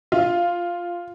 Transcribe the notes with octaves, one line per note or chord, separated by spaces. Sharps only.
F4